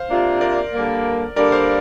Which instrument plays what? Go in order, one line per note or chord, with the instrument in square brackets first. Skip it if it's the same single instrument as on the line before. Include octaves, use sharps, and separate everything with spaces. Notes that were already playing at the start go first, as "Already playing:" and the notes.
Already playing: [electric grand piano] C5 F5
[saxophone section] C3 A#3 D4 F4
[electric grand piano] A#4 D5
[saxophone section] D3 G3 A#3
[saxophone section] D3 G3 A#3 D4 [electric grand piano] A#4 D5
[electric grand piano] C5 F5